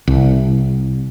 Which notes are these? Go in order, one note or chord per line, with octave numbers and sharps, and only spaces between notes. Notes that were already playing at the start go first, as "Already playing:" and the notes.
C2